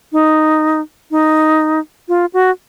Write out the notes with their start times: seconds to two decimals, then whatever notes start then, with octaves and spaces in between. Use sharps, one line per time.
0.12 D#4
1.11 D#4
2.08 F4
2.34 F#4